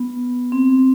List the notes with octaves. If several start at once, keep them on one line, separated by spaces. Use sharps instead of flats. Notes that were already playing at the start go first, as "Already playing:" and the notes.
Already playing: B3
C4